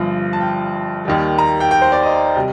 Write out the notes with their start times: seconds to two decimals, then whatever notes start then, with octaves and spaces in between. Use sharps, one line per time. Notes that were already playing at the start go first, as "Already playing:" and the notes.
Already playing: G1 G2 F3
0.33 A5
0.41 G5
1.05 D#2 D#3 G3
1.38 A#5
1.60 G5
1.71 G5
1.82 C5
1.92 D5
2.03 D#5
2.36 C3 G3